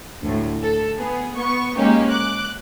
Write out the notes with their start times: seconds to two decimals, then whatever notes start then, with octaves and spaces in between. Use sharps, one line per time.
0.24 D2 A2
0.61 A4
0.98 B3 G#4
1.35 B3 C#6
1.77 G#3 A#3 C#4 D#4 G4
2.09 D6 F#6